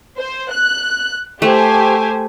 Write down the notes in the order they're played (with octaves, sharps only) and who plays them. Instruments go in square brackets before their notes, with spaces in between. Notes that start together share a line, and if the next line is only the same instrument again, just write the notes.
[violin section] C5
F#6
[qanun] A3 [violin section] G4 C5 G#5